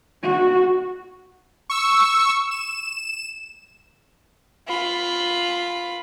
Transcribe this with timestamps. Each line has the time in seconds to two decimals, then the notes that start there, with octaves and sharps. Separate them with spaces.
0.23 F#4
1.70 C#6 E6
2.51 E7
4.68 F4 B5